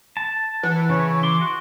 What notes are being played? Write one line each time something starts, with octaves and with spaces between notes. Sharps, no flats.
A5
E3 F#5
C#3 C#5
C6 D6
F#4